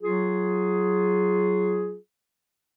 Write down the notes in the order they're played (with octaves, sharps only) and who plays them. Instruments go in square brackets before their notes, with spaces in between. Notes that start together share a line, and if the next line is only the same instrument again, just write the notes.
[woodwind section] F#3 F4 G#4